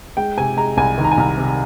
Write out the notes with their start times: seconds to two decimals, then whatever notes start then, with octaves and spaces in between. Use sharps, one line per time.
0.17 G#3 G5
0.37 C3 G#5
0.57 G#3 A#5
0.77 C2 G#5
0.98 D#3
1.04 A#5
1.11 G#5
1.17 C2 A#5
1.37 C3